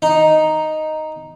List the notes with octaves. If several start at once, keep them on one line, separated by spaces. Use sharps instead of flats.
D#4